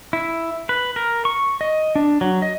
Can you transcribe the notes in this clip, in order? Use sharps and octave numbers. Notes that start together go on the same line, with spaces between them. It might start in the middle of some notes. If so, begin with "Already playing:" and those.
E4
B4
A#4
C#6
D#5
D4
F#3
D#5